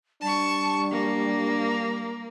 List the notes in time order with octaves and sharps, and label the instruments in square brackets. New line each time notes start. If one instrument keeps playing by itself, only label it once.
[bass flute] G3 [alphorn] D4 [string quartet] A5 C#6
[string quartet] A#3